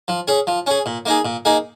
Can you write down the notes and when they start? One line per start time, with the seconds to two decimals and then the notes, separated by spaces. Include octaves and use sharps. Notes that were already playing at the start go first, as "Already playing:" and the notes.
0.08 F3
0.28 C#4 G#4
0.47 F3
0.67 C#4 G#4
0.86 A#2
1.06 A#3 D#4 G#4
1.25 A#2
1.45 A#3 D#4 G#4